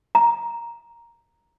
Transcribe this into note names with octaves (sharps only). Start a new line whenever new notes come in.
A#5